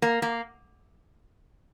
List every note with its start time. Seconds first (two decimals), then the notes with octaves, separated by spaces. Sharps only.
0.02 A#3
0.22 A#3